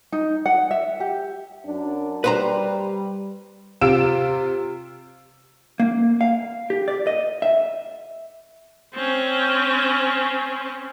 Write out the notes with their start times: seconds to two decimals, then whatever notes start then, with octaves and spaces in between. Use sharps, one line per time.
0.12 D#4
0.46 F#5
0.71 E5
1.00 G4
1.65 F#2 D4
2.24 G3 B4 C5 A#5
3.81 C3 F4 E6 D7 E7
5.80 A#3
6.21 F5
6.70 G4
6.88 D5
7.07 D#5
7.42 E5
8.95 C4 C#4